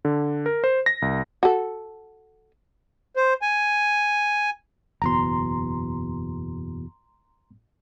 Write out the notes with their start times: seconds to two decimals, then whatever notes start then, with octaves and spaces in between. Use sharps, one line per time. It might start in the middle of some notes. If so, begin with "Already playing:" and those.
0.05 D3
0.46 A#4
0.64 C5
0.86 A#6
1.02 C2
1.43 F#4 A4
3.16 C5
3.42 G#5
5.02 F#1 E2 B2 A#5 C6